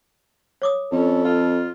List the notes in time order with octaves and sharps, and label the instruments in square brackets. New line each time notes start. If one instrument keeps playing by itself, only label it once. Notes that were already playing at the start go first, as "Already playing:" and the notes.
[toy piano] C#5 D6 D#6
[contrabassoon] F2 [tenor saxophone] C#4 [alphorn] A4
[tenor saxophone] F4